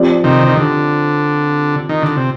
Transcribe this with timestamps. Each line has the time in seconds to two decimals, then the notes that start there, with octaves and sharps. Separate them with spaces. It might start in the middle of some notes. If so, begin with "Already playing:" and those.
Already playing: F3 C4 G4 D5
0.24 C3 D#3
0.47 D#3
0.57 D3
1.89 D#3
2.02 D3
2.17 C3